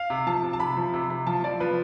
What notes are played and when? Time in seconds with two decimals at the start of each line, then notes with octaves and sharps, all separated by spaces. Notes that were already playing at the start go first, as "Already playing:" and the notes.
Already playing: F5
0.10 C3
0.27 F3 A5
0.43 C3
0.53 A5
0.60 C3 B5
0.77 F3
0.94 C3
1.10 C3
1.27 F3 A5
1.44 F3 D5
1.60 F3 B4